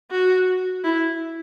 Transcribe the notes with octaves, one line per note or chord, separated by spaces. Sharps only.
F#4
E4